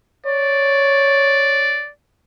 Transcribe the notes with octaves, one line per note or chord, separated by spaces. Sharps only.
C#5 D5